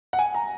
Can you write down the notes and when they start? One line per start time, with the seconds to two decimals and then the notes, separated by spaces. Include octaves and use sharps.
0.13 F#5
0.19 G#5
0.34 A#5